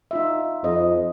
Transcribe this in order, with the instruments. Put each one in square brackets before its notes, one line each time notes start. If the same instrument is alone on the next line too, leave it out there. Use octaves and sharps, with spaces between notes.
[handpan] D#4 F4 E5
[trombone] F2 [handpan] C5 D#5